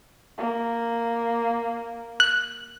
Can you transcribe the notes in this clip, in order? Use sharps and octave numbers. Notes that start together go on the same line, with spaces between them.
A#3
F#6